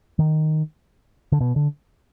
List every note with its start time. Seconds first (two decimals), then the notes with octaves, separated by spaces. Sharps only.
0.19 D#3
1.32 D3
1.40 B2
1.56 D3